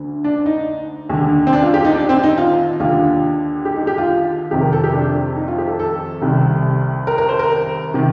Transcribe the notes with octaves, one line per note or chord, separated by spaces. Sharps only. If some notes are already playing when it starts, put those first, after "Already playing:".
Already playing: D2 D3
D4
D#4
D#2 D3
C4
D4
F4
G4
D#4
D4
C4
D#4
F4
D#2 D3 F4
G4
D#4
G4
F4
F2 C3 D#3 G4
A#4
A4
G4
D4
D#4
F4
G4
A4
A4
C2 C3 D#3
A#4
A#4
C5
A#4
C3 D#3